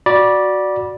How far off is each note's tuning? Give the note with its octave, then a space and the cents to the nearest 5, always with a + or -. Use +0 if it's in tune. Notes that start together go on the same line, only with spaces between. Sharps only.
F#4 +0 D5 +0 B5 -30